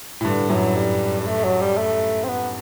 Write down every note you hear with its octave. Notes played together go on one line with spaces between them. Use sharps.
A2
G2 D3
F#2 A2 F#3
G3
G3
A3
F#3
G3
A3
C4
B3